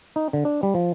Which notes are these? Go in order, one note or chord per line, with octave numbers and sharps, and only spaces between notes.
D#4
D3
D4
G3
F3